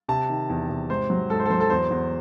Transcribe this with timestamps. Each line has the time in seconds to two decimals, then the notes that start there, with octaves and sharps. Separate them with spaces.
0.08 C3 A5
0.30 D#3
0.50 E2
0.70 C3
0.89 G#2 C5
1.10 F#3
1.30 G#2 A4
1.39 C5
1.46 A4
1.50 F#3 C5
1.60 A4
1.70 E2 C5
1.91 E2